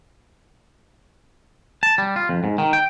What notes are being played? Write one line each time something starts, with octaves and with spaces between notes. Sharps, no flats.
A5
G3
F4
F2
G#2
D#3
G5